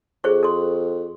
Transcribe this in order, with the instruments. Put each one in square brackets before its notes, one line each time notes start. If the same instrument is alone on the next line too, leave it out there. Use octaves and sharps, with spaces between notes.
[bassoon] F2 [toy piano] G#4 C5 C#6
[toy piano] A4 C6